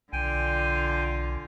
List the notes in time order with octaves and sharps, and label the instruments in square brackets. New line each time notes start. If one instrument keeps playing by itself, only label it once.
[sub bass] B1 [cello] D3 F4 [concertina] G5 G#5